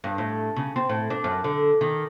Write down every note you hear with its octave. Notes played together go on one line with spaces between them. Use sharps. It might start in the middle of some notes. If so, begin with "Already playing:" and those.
G2
A2
C#3
C4
A2
D4
F#2
D3
D#3